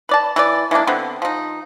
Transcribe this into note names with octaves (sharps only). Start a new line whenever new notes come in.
B4 D5 A5
E3 B4 D5
E3 G#3 A#3 D4
D3 B3 C4
F3 D#4